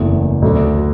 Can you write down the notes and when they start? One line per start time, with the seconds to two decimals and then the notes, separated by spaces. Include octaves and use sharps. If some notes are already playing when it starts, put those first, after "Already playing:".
Already playing: F#1 E2 E3 A3
0.42 D2 D3 F#3